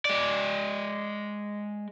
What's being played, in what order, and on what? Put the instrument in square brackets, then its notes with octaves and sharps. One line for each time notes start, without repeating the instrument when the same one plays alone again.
[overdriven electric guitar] G#3 D5